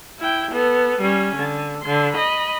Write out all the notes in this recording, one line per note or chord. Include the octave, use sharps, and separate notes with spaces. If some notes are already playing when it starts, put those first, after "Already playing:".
E4 G5
B3 A4
G3 C#4
D3
D3 C6
D#5 B5